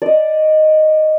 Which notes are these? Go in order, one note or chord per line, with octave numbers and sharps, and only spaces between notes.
D5 D#5